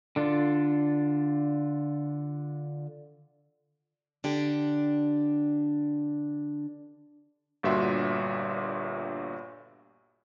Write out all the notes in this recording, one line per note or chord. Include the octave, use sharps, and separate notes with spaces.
D3 D4 F4
D3 D4 G4
G1 G2 A#2 F#4 E5 C6